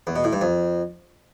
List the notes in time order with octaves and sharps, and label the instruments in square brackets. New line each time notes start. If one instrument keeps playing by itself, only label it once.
[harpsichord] E2
B2
A2
G2
F2